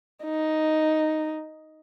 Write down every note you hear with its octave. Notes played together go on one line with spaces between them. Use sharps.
D#4